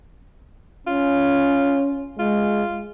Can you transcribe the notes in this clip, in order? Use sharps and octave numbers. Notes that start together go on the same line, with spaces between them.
C#4 F4
G#3 F4